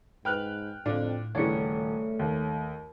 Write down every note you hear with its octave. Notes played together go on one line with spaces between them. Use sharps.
G#2 B4 G5 F6 F#6
F2 A2 D3 D4 F4
D#1 C#3 E3 A3 D4 C#5 C#7
D#2